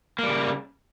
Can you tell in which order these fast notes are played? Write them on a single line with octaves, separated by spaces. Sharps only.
A#3 G3 C#3